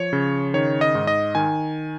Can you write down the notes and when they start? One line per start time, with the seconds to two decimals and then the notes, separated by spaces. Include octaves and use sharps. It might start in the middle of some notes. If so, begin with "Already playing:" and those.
Already playing: F3 C#5
0.13 C#3
0.54 D#3 C#5
0.81 D#5
0.95 G#2
1.07 D#5
1.35 D#3 G#5